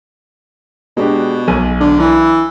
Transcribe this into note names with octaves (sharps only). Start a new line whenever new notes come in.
B2 G#3 D4 G4
B1 G#5 D#7
D3
E3